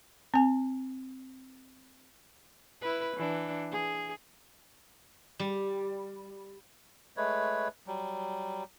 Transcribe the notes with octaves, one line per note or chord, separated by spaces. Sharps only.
C4 G#5
E4 B4
E3 D4
G#4
G3
G#3 A3 B4 C#5
F#3 G3